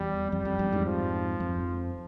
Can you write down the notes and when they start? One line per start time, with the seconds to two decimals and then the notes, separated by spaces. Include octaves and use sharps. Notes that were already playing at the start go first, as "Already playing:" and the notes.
Already playing: E2 G3
0.31 F2 G3
0.45 F2
0.59 E2 G2
0.72 F2 G#2
0.86 F3
1.40 F2